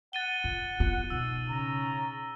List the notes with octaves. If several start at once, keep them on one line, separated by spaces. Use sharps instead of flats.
F#5 A6 D#7 G7
F4
B3 F4
B2 D#4 E6
C#3 A#5